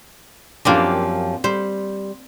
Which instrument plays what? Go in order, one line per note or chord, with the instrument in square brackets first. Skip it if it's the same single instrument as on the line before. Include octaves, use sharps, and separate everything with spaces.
[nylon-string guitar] F#2 F3 G4 [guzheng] A#3 C4 D4
[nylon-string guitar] G3 [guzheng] C5